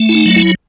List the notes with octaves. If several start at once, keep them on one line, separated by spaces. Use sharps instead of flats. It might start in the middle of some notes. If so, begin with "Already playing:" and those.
Already playing: A3
E4
D#4
F#3
E4